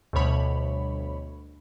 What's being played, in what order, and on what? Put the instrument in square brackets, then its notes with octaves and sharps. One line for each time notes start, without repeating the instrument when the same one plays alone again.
[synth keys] D2 B2 G3 C#5 B5